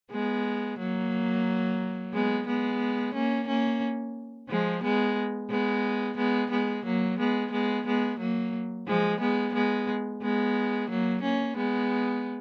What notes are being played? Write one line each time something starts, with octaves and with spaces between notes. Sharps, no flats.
G#3 B3
F#3 A#3
G#3 B3
G#3 B3
A#3 C#4
A#3 C#4
F3 G#3
G#3 B3
G#3 B3
G#3 B3
G#3 B3
F#3 A#3
G#3 B3
G#3 B3
G#3 B3
F#3 A#3
F3 G#3
G#3 B3
G#3 B3
G#3 B3
F#3 A#3
A#3 C#4
G#3 B3